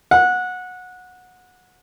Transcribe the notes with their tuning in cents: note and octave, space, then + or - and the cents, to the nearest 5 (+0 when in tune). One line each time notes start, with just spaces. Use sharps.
F#5 -20